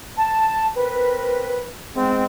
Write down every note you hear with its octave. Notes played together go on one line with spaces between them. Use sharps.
A5
C4 A#4 B4
G#2 G#3 B3 C4